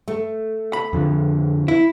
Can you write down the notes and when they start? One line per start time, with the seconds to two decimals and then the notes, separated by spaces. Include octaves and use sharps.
0.08 A3
0.73 B5
0.93 F2 D3 F3
1.68 E4